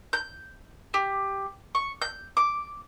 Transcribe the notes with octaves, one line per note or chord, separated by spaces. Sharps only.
G6
G4
C#6
G6
D6